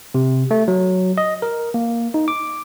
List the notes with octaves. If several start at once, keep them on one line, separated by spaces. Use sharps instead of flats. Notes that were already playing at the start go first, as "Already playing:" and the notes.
C3
A3
F#3
D#5
A#4
A#3
D#4
D6